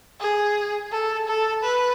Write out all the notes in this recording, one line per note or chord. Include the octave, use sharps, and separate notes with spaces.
G#4
A4
A4
B4